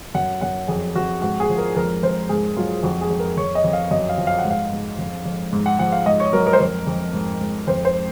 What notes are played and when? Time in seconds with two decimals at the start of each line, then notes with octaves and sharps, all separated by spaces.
0.15 F#2 F#5
0.41 F#2 F#5
0.68 F2 G#4
0.96 F2 F#4
1.22 G#2 F#4
1.40 G#4
1.49 F3
1.58 A#4
1.76 F2 A#4
2.03 F2 C5
2.29 G#2 G#4
2.56 F#3 F4
2.83 F2 F#4
3.01 G#4
3.11 F2
3.19 A#4
3.37 F2 C#5
3.55 D#5
3.64 F2
3.73 F5
3.91 F#2 D#5
4.09 F5
4.18 F3
4.27 F5
4.39 F#5
4.45 G#2
4.50 F5
4.72 G#2
4.99 F2
5.25 F2
5.53 G#2
5.66 F#5
5.79 F3 F#5
5.92 F5
6.06 G#2 D#5
6.20 C#5
6.33 F#3 A#4
6.47 A#4
6.53 C5
6.60 F2 A#4
6.87 F2
7.13 G#2
7.41 G#2
7.67 F2 C5
7.85 C5